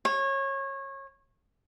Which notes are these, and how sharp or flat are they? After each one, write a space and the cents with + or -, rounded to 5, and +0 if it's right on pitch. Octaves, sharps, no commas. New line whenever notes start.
C#5 -25